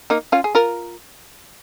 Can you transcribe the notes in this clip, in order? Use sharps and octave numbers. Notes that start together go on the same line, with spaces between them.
A#3 D#4
C#4 F4
G#4
F4 A#4